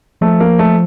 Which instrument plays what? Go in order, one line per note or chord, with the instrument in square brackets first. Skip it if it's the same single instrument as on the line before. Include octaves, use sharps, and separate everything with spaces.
[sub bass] F3 [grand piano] A3
[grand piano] A#3
A3